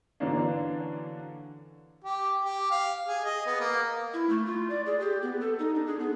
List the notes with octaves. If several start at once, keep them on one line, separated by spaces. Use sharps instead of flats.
D3 E3 F#3 A#3 C#4 D4
G4
G4
F5
G#4
D#5
B3
A#3
E4
A3
F4
D5
G#4
G4
B3
A4
D#4
D4
G#4
B3